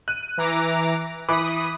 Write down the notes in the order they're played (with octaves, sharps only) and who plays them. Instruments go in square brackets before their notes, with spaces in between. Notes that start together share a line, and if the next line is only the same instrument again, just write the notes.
[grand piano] F#6 [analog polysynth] D#7
[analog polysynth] E3 A#5 D6
[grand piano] E3 D6 [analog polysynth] B5 D#6